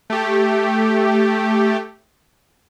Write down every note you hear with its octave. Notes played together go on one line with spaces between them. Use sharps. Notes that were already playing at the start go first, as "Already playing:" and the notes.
A3 G4